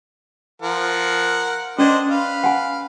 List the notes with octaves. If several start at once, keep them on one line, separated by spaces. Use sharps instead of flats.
F3 A#4 F#5
C#4 D4 C5 D5 D#5
B4 F5
F#5 G#5